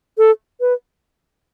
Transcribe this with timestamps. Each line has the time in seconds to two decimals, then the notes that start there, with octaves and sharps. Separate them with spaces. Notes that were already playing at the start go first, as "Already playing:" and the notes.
0.18 A4
0.60 B4